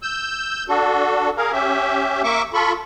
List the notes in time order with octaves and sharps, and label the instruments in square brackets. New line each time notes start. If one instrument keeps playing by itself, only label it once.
[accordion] E6 G6
D4 F#4 A4
G#4 A#4 F5
C#4 G4 E5
A#3 E5 C#6 D6
F4 A4 B5 C#6